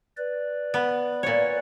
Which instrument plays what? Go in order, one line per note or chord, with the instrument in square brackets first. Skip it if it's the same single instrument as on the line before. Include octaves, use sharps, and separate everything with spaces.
[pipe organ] B4 D5
[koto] B3
A#2 C#5